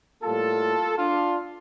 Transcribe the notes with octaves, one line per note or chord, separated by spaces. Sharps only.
A2 G3 A#3 F4 A4
D4 F4